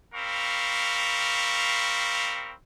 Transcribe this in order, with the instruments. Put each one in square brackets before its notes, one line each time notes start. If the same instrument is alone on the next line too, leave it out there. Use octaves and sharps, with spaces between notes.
[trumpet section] G3 C4 A#4 F5 B5 C#6